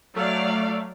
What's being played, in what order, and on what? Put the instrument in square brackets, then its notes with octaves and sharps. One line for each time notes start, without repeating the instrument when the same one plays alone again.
[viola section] F#3 D5 F5 [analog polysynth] A3